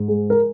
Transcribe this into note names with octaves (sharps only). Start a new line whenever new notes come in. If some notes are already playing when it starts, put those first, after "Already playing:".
Already playing: G#2
G#3
A#4